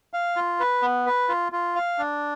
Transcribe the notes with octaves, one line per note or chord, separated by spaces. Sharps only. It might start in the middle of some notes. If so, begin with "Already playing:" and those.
F5
F4
B4
B3
B4
F4
F4
F5
D4